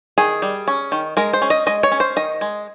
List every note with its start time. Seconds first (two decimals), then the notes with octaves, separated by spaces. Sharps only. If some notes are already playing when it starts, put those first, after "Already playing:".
0.18 D#3 G#4
0.42 G3
0.68 C#4
0.92 D#3
1.17 G#3 A#4
1.33 C5
1.42 C#4
1.50 D#5
1.66 G#3 D#5
1.83 C#5
1.92 C#4
2.00 C5
2.16 D#3 D#5
2.41 G#3